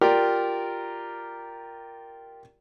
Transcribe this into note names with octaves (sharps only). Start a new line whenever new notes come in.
F4 G4 A#4 D5